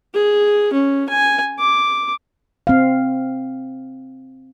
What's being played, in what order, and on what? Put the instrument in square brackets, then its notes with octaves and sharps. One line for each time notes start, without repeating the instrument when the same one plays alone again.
[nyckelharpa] G#4
C#4
G#5
D6
[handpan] C4 F5